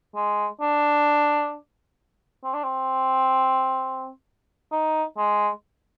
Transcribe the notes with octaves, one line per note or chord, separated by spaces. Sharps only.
G#3
D4
C4
D4
C4
D#4
G#3